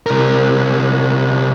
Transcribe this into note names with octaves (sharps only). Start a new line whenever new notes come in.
C2 A#4